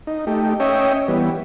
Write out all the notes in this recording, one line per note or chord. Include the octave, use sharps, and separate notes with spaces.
D#4
A3 D#4 G4
C#4 C#5 D#5 E5 G5
E3 G3 B3